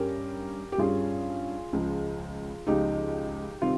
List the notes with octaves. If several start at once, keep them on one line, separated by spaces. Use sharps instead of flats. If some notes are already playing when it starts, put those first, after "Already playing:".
Already playing: G2 G3 C#4 G4 A#4
G4
G2 G3 C#4 F4 G#4
C#2 C#3 F3
C#2 C#3 F3 D#4 G4
C3 D#3 G3 C4 F4